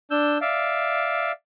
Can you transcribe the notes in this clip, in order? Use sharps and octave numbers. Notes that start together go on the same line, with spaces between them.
D4 E6 G6
D5 E5 F5